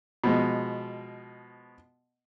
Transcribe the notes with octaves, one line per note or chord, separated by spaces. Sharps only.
B2 F3 G#3